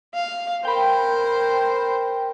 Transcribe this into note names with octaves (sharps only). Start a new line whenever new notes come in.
F5
A#4 C5 G5 B5